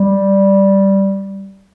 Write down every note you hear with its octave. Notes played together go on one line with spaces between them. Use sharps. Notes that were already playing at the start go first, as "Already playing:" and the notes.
Already playing: G3